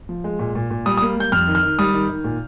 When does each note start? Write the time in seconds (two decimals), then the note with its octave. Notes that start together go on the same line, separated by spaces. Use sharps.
0.09 F3
0.24 G#3
0.39 A#2
0.55 A#2
0.70 A#2
0.86 G3 D#6
0.97 D#6
1.02 A#3
1.17 G3 G6
1.32 F2 F6
1.47 D#3
1.55 F6
1.63 D#3
1.79 G3 D#6
1.94 D#3
2.10 D#3
2.24 A#2